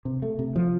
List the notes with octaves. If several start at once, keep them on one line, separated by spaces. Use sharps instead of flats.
C3
A3
C3
F3